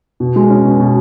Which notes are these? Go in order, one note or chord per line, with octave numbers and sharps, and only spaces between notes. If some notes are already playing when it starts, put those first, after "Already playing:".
B2
G#3
C#4
B2
B2